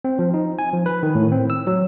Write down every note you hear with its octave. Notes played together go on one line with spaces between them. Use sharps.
C4
F3
D#4
G#5
F3
B4
D#3
A2
C4
E6
F#3